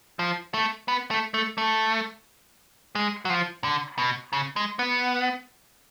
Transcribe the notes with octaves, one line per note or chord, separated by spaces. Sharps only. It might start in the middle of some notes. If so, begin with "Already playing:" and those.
F3
A3
B3
A3
A3
A3
G#3
F#3
F3
D3
B2
C#3
G#3
B3